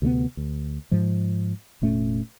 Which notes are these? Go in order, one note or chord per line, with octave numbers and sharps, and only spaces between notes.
D2 C3 G#3 B3
D2
G#2 F3 G#3
F1 A#2 A3 C#4